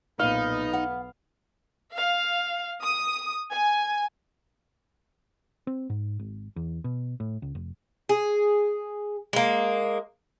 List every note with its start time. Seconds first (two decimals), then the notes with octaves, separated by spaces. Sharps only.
0.19 B1 F2 A#2 B3 D#4 F5
0.73 F#5
1.97 F5
2.82 D#6
3.52 G#5
5.67 C4
5.90 G#2
6.19 G#1
6.56 E2
6.84 B2
7.20 A2
7.42 C#2
7.55 F1
8.09 G#4
9.33 G#3 A#3